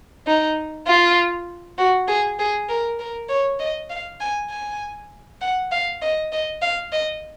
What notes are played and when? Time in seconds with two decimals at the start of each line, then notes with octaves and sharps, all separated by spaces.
0.27 D#4
0.88 F4
1.78 F#4
2.08 G#4
2.39 G#4
2.69 A#4
2.99 A#4
3.29 C#5
3.60 D#5
3.90 F5
4.21 G#5
4.50 G#5
5.41 F#5
5.72 F5
6.02 D#5
6.32 D#5
6.62 F5
6.92 D#5